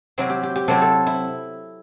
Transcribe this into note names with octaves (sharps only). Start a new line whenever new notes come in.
C3 F#3 C4 E4
G4
G4
G4
C3 F#3 C4 E4 A4
A4
E4